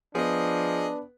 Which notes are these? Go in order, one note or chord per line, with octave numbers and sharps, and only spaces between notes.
F3 B3 D4 G#4 B4 D#5